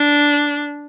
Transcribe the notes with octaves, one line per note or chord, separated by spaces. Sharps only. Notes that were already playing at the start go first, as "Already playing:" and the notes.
Already playing: D4